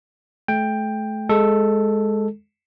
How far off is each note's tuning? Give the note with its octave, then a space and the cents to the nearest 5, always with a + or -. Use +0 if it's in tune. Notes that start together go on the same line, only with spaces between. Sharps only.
A3 -35 G5 +10
G#3 +0 A4 +0